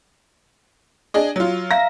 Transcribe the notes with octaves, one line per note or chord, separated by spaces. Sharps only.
D4 G#4 D#5
F#3 F4
E5 F5 A#5 A#6